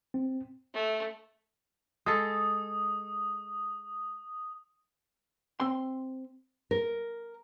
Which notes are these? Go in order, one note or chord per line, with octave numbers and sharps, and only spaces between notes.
C4
A3
G#3 A4 D#6
C4 C6
A#4